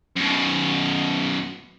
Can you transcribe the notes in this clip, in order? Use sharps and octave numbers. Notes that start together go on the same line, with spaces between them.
F#2 B2